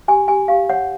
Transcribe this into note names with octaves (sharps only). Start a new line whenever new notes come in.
G4 G#5
G4 G#5
G4 F5
C#5 F#5